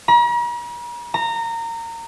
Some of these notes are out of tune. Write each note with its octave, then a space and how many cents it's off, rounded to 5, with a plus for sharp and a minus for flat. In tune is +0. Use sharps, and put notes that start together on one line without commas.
A#5 +45
A#5 -20